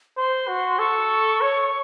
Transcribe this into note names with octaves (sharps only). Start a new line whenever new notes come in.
C5 C6
F#4
A4 C#6
C#5